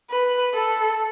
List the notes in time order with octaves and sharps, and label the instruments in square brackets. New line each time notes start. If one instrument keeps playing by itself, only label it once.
[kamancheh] B4
A4